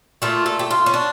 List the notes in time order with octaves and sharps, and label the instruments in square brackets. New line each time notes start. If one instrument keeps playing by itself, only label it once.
[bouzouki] A#2 A3 F4
A4
G4
F4
C#4
D4